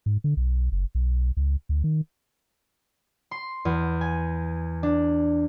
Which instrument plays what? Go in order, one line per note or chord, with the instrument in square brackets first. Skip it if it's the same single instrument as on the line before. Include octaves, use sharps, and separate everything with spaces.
[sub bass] G#2
D3
B1
F#1
B1
C#2
D2
D#3
[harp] C6
E2
G#5
D4